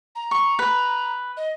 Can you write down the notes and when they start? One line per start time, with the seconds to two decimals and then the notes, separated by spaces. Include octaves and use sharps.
0.16 A#5
0.31 C#6
0.59 B4
1.37 D#5